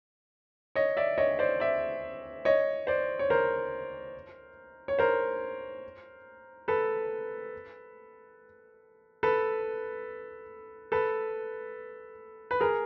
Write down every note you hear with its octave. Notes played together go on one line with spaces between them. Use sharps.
C#5 D#5
D5 E5
C#5 D#5
C5 D5
D5 E5
C#5 D#5
C5 D5
C#5
A#4 C5
C#5
A#4 C5
A4 B4
A4 B4
A4 B4
B4
G#4 A#4